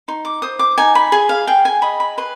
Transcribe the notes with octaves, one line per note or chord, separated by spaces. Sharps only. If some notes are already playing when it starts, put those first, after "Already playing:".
D#4 C6
D6
C5 D#6
D6
D#4 G#5
B5
G#4 G#5
F5
G#4 G5
G#5
D#5 B5
B5
B4 C6